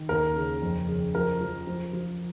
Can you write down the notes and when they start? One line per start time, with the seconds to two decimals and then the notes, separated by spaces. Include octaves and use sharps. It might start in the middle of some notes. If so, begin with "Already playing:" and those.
Already playing: D#3
0.09 D#2 A#4
0.36 C#3
0.62 F2
0.88 C#3
1.15 F3 A#4
1.41 F3
1.67 F3
1.93 F3